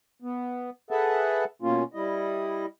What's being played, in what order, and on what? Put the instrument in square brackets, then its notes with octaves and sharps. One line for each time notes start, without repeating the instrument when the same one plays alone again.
[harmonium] B3
G#4 A4 B4 E5 F#5 A5
B2 A#3 C#4 F4
G3 E4 D#5